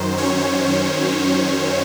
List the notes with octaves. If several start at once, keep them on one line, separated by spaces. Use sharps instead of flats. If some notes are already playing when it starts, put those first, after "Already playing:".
Already playing: F#2 D#3 F#3 C5
C#4 C#5
C5